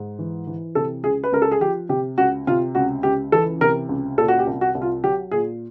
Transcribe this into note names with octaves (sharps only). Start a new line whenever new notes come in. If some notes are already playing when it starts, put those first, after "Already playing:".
Already playing: G#2
E3
E3
C3 A4
C#2 G#4
B4
C#2 A#4
A4
G#4
F3 G4
C3 G4
C#2 F#4
C3 F4
C#2 F#4
C#2 G4
E3 A4
C3 A#4
C#2
A#2 A4
F#4
G4
C2
F#4
C2
F4
F#3 G4
A#2 G#4